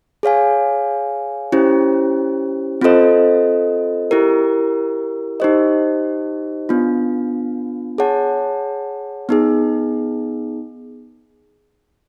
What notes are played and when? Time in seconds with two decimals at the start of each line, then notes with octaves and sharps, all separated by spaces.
0.23 G#4 C#5 F5 G#5
1.52 C#4 E4 G4 C5
2.81 C4 F4 A4 C5 D#5
4.11 E4 G4 A#4
5.40 D#4 G4 C5 D#5
6.69 B3 D4 F4
7.98 G#4 C#5 F#5 A5
9.29 B3 D#4 G#4